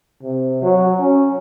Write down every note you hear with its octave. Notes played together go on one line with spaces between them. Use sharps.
C3
F#3
C#4